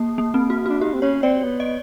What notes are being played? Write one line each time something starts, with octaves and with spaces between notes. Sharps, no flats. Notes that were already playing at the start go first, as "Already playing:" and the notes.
Already playing: A#3
A#3
C4
F#4
F#4
D4
D#4 G4
C4
C#4 C#5
C4 D5
B3
D#5